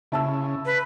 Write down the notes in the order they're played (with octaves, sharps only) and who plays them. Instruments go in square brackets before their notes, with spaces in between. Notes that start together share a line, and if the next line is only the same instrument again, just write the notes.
[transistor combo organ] C#3 [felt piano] E4 A5 E6
[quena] B4